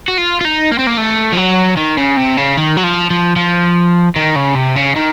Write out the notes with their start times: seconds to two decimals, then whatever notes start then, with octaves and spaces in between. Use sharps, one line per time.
0.08 F#4
0.18 F4
0.41 F4
0.45 D#4
0.71 A#3
0.79 C4
0.87 A#3
0.97 A3
1.32 F3
1.37 F#3
1.77 D#3
1.97 C#3
2.17 C3
2.37 C#3
2.57 D#3
2.77 F#3
2.83 F3
3.10 F3
3.36 F3
4.16 D#3
4.36 C#3
4.55 C3
4.76 C#3
4.96 D#3